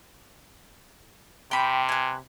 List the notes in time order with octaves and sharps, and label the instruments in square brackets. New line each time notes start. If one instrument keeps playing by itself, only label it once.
[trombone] C3 [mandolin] G5 B5
[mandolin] B4 G#5